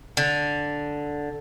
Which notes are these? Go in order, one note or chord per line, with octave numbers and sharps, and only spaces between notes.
D3